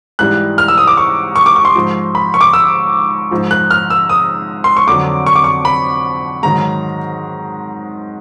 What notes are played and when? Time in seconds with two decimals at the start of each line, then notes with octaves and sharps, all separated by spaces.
0.19 G#2 E3 G3 F#6
0.58 F6
0.68 E6
0.78 D#6
0.87 D6
0.97 C#6
1.36 C#6
1.46 D6
1.56 C#6
1.65 C6
1.75 G#2 F3
2.15 B5
2.34 C#6
2.41 D6
2.53 E6
3.31 G#2 F3
3.51 F#6
3.71 F6
3.90 E6
4.09 D#6
4.64 C6
4.77 C#6
4.87 F2 D3 F#3 D6
5.26 C#6
5.36 D6
5.44 C#6
5.65 B5
6.43 G#2 D#3 F#3 A#5